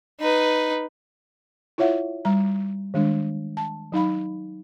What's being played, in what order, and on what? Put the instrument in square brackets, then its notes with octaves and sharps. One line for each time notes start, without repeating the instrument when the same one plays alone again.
[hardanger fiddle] D#4 B4
[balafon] E4 F4 C#5 E5 F#5
G3 A#5
D#3 G#3 D4
A5
F#3 D#4 F5 B5